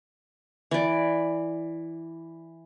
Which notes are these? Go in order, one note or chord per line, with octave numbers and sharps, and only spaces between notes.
E3 D5